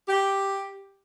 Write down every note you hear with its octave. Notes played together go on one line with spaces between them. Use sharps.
G4